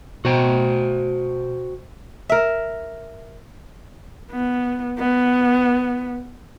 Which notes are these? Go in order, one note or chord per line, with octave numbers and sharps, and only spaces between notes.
B2 F#4 C5 G5
A#4 E5
B3
B3